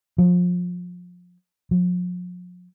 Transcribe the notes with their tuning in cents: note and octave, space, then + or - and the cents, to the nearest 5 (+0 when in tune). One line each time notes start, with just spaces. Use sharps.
F3 +30
F3 +45